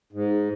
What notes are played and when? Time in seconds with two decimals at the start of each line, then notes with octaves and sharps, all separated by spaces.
0.13 G#2